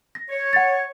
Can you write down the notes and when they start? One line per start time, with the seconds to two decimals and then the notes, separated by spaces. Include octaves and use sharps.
0.15 A#6
0.29 C#5
0.53 F#5 A6